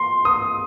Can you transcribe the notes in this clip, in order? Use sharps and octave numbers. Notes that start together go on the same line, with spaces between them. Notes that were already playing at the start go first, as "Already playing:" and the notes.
Already playing: C6
D#6